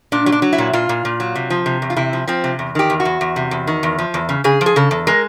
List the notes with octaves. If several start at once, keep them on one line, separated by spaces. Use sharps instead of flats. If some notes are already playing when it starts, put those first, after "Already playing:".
A#2 D4
F#3
D4
F#3
E4
A#2
A#2 F4
A#2
A#2
F#3
C3
F3
C3
E2
F4
C3 E4
F3
F3 C4
C3
E2
D#3 G4
E2
F#4
E2
E2
C3
E2
D#3
E2
F3
E2
C#3
C#3 G#4
F3
G#4
C#3 A4
E2
G#3 A#4